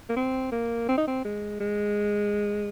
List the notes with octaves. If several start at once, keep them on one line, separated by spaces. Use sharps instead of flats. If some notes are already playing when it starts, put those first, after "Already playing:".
A#3
C4
A#3
C4
D#4
C4
G#3
G#3